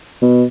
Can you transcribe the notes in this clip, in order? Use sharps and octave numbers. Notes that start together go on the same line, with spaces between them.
B2